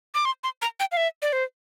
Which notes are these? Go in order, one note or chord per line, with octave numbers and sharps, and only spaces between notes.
D6
C6
C6
A#5
G5
F5
E5
D5
C5